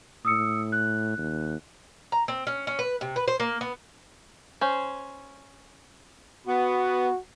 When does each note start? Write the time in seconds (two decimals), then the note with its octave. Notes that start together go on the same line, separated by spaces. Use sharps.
0.25 A2 D#6 E6 C#7
0.72 F#6
1.18 D#2
2.12 A#5
2.28 C4
2.47 C#4
2.67 C#4
2.79 B4
3.01 C3
3.16 B4
3.28 C5
3.40 A#3
3.61 B3
4.61 C#4 C5
6.47 B3 F#4